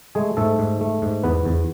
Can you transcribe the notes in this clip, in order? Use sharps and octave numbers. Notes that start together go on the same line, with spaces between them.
G#3 A3 G#4
G#2 A3 A4
G#2
A3
G#2
E2 B3 B4
E2